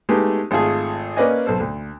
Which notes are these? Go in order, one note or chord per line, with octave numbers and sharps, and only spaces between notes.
G#3 A3 B3 D#4 G4
G#1 A3 F4 G#4
A#3 C#4 B4 D5 D#5 G#5
B1 A4 C5
D2